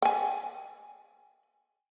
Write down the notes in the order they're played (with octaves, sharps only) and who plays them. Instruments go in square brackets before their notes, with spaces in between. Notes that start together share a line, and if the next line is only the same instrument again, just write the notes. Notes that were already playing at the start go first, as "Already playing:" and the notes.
[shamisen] G5 G#5